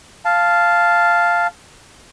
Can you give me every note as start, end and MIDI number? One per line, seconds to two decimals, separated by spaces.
0.25 1.47 77
0.25 1.47 81